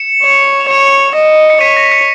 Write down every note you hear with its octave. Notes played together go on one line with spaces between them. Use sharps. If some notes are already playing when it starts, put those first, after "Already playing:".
Already playing: C#7 E7
C#5
C#5
D#5
C#7
C#5 B6 D#7
A#6
B6
A#6 C#7